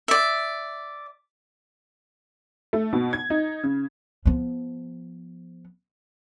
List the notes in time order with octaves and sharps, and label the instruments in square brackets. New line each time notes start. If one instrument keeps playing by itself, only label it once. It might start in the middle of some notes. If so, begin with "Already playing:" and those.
[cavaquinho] D5 E5
[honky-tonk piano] A3
B2
G#6
D#4
C#3
[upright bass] F3 B3